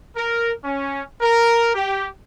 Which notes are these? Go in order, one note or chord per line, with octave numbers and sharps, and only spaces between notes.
A#4
C#4
A#4
G4